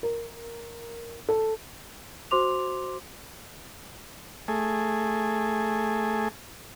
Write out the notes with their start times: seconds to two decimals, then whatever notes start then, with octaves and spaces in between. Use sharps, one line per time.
0.03 A#4
1.29 A4
2.31 F#4 C5 C6 D6 F7
4.48 A3 G#4